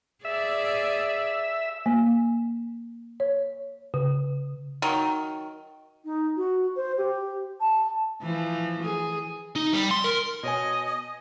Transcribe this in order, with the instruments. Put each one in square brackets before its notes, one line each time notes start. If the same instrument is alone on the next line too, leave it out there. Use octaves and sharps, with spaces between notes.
[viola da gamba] G#4 D5 [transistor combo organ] E5
[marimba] A#3
C#5
C#3
[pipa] D#3 F#3
[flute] D#4
F#4
C5
G4
A5
[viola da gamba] E3 F3
G#4
[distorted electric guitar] D#4
G3
C6
A#4
[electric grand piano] B2 C#5 G#5 [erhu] D#5